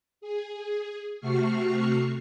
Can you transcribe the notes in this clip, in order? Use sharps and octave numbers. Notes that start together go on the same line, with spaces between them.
G#4
C3 A3 F#4 C#6 F6 C7